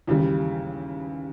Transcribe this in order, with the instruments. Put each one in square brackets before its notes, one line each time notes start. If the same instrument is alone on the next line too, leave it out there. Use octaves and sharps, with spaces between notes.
[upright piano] D#2 C#3 E3 G3